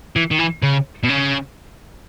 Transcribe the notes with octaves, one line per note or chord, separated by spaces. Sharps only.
E3
D#3
E3
C#3
B2
C#3